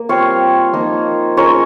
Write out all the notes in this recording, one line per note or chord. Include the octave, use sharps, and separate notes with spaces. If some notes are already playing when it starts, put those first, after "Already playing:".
Already playing: A#3
G3 C4 F4 C#5 F5
F3 A#3 D#4
G#3 C#4 F4 A#4 C#5